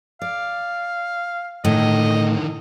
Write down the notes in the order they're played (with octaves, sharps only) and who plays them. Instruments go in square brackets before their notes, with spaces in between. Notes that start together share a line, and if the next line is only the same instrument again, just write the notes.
[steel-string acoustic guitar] D5 [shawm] F5
[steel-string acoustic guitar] A2 [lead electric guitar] D3 D#3 [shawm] D#5